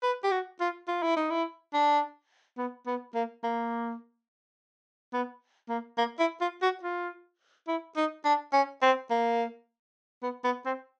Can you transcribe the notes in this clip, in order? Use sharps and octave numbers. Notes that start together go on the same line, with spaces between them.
B4
G4
F#4
F4
F4
E4
D#4
E4
D4
B3
B3
A#3
A#3
B3
A#3
A#3
E4
F4
F#4
F4
E4
D#4
D4
C#4
C4
A#3
B3
B3
C4